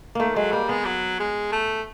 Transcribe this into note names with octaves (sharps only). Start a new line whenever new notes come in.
D#3 A3 A#3
F#3 G#3
G3 A#3
G#3 B3
F#3
G#3
A3